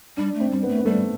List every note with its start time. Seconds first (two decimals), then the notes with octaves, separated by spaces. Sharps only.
0.17 G3 D4
0.35 A3
0.40 C4
0.51 G3 C4
0.63 B3
0.69 A3
0.78 B3
0.85 G3 A3